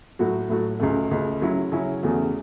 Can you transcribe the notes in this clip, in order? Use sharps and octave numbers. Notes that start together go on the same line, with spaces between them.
A2 F#3 A3 F#4
A2 F#3 A3 F#4
C#2 C#3 A3
C#2 C#3 A3
C#3 F#3 C#4 E4
C#3 F#3 C#4 E4
E2 C#3 A3 F#4